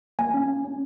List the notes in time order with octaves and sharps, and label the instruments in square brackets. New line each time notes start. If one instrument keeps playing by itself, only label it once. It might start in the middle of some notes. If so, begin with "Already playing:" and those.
[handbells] A#3 G#5
C#4
C#4
C#4